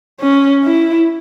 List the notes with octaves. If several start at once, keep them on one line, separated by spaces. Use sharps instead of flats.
C#4
E4